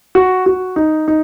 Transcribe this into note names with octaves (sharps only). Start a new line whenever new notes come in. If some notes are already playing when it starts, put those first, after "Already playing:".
F#4
F#4
D#4
D#4